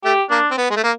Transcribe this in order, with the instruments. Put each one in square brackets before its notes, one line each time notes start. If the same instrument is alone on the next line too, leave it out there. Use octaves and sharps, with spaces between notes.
[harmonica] A3 [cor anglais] G4
[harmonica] A#3 [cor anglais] D4
[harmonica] C4
B3
G#3
A3
A#3